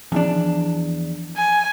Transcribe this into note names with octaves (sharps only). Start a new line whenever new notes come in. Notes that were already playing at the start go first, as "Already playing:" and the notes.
E2 E3 F3 D4
G#5